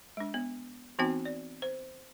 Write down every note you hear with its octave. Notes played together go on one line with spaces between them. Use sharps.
G#3 D4
B3
E3 B3 C4 D#4 F#4 G5
D5
C5